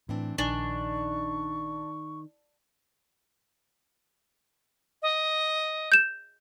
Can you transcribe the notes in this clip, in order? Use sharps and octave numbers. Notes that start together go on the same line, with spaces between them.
A2 E3 C4 D4
A#1 D#3 D4 D#4 G#5 C#6
D#5
G6 E7